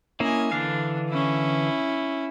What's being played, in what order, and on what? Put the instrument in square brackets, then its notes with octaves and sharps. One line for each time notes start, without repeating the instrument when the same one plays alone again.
[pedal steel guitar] A#3 C#4 E4 [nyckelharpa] D#5 G#5
[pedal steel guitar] D3 E3 F5 [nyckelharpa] D4
[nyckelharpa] C#4 E4